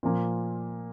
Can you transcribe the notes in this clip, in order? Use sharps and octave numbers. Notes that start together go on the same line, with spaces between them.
A#2 F3 A#3